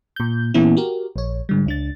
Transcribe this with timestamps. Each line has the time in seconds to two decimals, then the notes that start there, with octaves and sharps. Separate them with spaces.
0.16 A#2 G6
0.54 A#2 E3 B3 C#4 E4
0.77 F#4 G4 A#4
1.16 A#1 C#5
1.49 G#2 D3 G3
1.66 C#2 D4 A6